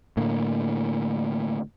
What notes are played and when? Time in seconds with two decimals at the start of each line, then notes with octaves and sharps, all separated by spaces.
0.17 A2 D3 A#3